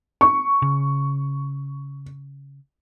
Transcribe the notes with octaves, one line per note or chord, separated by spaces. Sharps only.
C#6
C#3